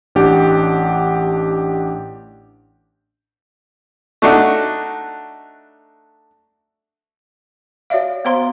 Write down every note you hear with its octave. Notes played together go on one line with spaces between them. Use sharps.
A1 D4 G4 F#5
A3 D4 D#4 F#4
F#4 C#5 D5 E5 F5
B3 F#4 C5 F5 A#5 C6